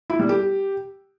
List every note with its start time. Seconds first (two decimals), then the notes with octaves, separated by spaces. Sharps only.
0.10 E4
0.19 G3
0.29 G4